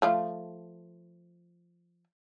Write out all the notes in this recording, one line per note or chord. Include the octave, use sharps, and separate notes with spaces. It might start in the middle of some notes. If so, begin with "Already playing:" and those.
F3 A3 F4